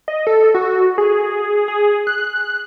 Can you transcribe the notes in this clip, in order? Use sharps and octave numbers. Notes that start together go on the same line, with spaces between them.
D#5
A4
F#4
G#4
G#4
F#6